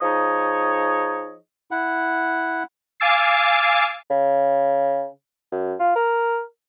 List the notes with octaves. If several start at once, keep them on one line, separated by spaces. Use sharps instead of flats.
F3 D#4 G#4 C#5 D#5
E4 F#5
F5 G#5 D6 E6 A6 C7
C#3
F#2
F4
A#4